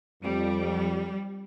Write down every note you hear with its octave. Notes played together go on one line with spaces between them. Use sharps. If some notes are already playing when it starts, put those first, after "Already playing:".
F2 G3